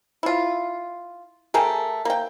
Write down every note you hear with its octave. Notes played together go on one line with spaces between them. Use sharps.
E4 F4
A3 G#4 A#4 G5
A#3 G5